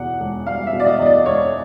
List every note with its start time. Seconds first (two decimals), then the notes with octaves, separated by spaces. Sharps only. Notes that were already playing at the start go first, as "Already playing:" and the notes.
Already playing: E2 B2 F#5
0.20 E1
0.46 G3 F5
0.67 E5
0.73 B2
0.80 D5
0.86 D#5
0.99 E2 D#5
1.06 D5
1.26 E1 C#5